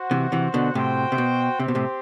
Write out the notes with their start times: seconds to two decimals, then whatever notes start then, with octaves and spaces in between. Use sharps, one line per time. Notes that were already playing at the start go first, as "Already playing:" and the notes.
Already playing: F#4 C5 F#5
0.11 C3 E3
0.32 C3 E3
0.54 B2 D3
0.75 A2 C3 F#4 C5 G5
1.12 C3
1.18 B2
1.60 C3 C4 G4 C5
1.68 B2
1.75 A2 C3